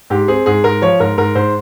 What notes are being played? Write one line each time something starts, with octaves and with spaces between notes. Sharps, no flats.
G#2 G4
C4 G#4
G#2 G#4
G#2 A#4
F3 C#5
G#2 A#4
G#2 A#4
G#2 C5